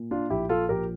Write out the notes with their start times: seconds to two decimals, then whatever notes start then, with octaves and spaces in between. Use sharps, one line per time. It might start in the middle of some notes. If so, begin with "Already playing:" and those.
Already playing: A#2
0.11 D4 F4
0.30 A#1 E4 G4
0.49 F4 A4
0.69 A#1 G4 A#4